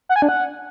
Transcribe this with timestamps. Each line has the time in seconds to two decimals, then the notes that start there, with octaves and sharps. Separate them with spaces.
0.09 F#5
0.16 G#5
0.22 D4
0.29 F#5